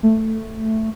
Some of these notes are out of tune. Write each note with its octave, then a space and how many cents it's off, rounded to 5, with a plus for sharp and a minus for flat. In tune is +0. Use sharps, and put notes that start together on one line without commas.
A3 +5